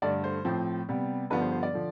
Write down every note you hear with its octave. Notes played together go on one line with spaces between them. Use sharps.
G2 D3 A3 D4 D5
C5
A2 F3 C4
C3 G3 B3
G2 D3 F3 B3 D4 B4
C5
C5
D5
D3 F3